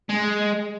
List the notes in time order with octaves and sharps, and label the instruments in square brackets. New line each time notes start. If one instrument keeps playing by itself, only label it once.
[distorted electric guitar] G#3